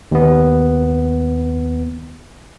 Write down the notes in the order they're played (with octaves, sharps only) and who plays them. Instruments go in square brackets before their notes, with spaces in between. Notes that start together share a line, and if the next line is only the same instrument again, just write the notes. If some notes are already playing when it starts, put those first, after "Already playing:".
[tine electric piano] D#2 B3